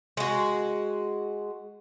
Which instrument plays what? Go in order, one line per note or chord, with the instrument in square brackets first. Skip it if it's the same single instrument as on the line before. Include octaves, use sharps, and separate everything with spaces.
[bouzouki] G#3 F#4